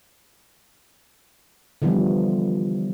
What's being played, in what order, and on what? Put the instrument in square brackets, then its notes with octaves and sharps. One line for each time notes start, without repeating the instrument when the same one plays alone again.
[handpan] D3 E3 F3 G3 B3